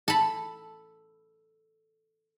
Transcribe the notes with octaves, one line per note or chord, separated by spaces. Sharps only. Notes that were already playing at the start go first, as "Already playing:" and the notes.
A4 B5